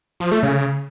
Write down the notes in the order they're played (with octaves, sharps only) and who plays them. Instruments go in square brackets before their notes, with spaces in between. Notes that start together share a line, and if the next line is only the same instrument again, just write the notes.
[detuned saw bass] F3
A3
C#3